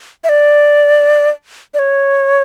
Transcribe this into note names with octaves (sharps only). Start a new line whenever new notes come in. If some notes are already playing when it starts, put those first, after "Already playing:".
E5
D5
D5
C#5